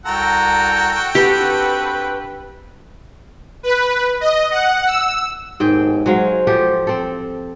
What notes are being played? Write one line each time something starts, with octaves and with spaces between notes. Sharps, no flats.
C2 F#4 A4 G5 A5 A#5
C4 D4 G4 B4
B4
D#5
F#5
E6
G#1 D#2 G#2 B2 G#4 G5
F#3 G#3 C5 F5
F3 G4 A4
C4 A4